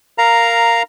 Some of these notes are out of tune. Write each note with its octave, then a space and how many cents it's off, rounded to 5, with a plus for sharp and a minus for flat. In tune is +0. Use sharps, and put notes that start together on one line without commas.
A#4 -5 F5 -5 A#5 +0